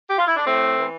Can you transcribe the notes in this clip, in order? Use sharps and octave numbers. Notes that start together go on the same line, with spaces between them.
G4
F4
E4
D4
A2 A3 C4
E3